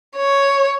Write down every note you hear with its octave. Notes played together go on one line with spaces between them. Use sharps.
C#5